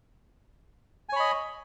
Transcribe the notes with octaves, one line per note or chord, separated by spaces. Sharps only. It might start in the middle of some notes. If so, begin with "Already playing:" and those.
C#5 D#5 G#5 B5